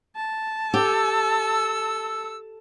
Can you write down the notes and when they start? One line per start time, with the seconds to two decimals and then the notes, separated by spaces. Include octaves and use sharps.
0.16 A5
0.74 G4 A4 E6